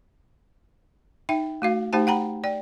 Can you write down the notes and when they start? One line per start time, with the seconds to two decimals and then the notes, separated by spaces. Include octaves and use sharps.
1.29 D#4 E5 G5
1.62 A3 F#4 F5
1.93 A3 D#4 G4 C5 G5 A5
2.07 F#5 G5 A#5 B5
2.44 D5 G5